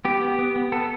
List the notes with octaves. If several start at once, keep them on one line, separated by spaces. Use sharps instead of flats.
B3 G4
B3
B3
B3
B3 A4